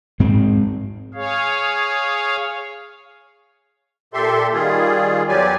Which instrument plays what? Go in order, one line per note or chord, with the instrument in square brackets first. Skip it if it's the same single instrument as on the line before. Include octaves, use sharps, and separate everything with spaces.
[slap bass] G#2 G#3 C4
[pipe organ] G#4 C#5 F5
[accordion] A#2 G4 A4 E5 C6
D#3 G3 F4 G#4
E2 F#3 G4 D5 G#5